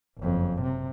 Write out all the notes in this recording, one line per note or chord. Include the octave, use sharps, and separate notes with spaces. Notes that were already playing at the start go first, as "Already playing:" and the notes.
F#1 F2
C3